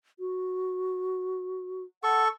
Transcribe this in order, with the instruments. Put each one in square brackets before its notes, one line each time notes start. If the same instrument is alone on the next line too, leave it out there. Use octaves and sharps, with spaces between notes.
[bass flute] F#4
[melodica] A4 C#6 [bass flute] F#5